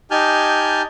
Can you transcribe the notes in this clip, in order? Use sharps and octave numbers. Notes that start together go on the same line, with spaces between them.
D#4 G4 G#5 A5 F6 G6